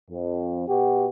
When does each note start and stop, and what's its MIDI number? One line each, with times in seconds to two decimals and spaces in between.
0.11 0.67 41
0.68 1.07 47
0.68 1.07 66
0.68 1.07 67